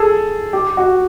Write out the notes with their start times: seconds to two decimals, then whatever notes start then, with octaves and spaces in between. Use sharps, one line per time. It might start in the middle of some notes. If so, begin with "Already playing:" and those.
Already playing: G#4 A4
0.53 G4
0.77 F#4